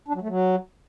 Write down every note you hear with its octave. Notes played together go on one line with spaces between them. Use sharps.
D4
F#3
A3
F#3